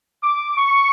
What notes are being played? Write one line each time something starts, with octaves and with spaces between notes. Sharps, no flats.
D6
C#6